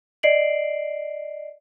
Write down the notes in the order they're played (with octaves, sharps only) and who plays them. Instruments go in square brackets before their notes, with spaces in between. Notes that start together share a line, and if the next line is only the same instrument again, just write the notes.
[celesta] D5 D#5 C7 D7 F#7